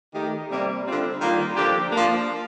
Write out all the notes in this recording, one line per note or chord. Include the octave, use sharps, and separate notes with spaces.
D#3 A3 D#4 G4
C3 G3 A#3
D3 G3 C4 F4
D#3 G3 A#3 F4
D3 F3 A#3 D4 G4
F3 A#3 D4